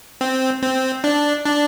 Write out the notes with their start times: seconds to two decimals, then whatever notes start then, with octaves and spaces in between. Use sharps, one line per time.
0.21 C4
0.63 C4
1.04 D4
1.45 D4